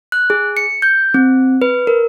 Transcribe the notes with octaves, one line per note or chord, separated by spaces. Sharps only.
F#6
G#4
C#7
G6
C4
B4
A#4